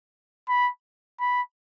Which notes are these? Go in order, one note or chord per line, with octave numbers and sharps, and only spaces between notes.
B5
B5